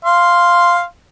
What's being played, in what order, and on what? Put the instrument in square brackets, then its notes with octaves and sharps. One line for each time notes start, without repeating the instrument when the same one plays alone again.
[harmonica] F5 C6